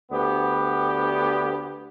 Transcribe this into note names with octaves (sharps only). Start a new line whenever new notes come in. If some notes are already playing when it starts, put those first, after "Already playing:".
D2 B3 G4